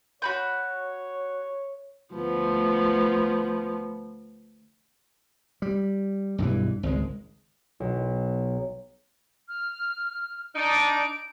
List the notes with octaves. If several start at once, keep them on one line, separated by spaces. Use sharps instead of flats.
F#4 C#5 B5 G6
D2 F3 B3
G3
B1 G2 D#3 E3
G#1 C#2 G#3
B1
F6
D4 D#4 D7